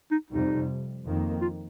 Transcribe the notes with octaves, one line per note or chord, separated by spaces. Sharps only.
D#4
F2 C3 G3 D#4
F2 D#3 A#3
F4